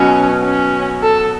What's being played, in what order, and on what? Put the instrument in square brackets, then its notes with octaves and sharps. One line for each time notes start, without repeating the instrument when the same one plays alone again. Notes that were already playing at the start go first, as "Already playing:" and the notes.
Already playing: [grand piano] B2 F#3 B3 [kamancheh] C#4
[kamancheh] C#4
A4